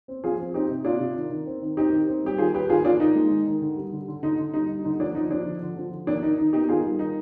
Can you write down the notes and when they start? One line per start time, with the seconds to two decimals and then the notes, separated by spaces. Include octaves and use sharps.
0.08 C4
0.24 F3 F4 G#4
0.39 C4
0.54 C4 D#4 G4
0.70 C3
0.85 C3 D4 F4
1.00 C3
1.16 D#3
1.31 D#3
1.47 C4
1.62 D#3
1.77 C4 D#4 G4
1.92 D#3
2.08 C4
2.24 G3 G4
2.38 D#3 F4 G#4
2.54 D#3 G4 B4
2.70 D#3 F4 G#4
2.85 D#3 D4 F4
3.00 D#3 D#4
3.15 G#3
3.30 D#3
3.46 D#3
3.61 D3
3.77 G3
3.93 D3
4.08 D3
4.23 D3 D#4
4.38 D3
4.54 G3 D#4
4.70 G3
4.84 D3 D#4
5.00 F3 D4
5.15 F3 D#4
5.30 F3 D4
5.46 D3
5.62 D3
5.76 F3
5.92 D3
6.07 D#3 D4
6.23 D#3 D#4
6.38 D#3 D#4
6.53 B3 D#4 G4
6.69 D#3 F4 G#4
6.84 G3
6.99 D#3 D#4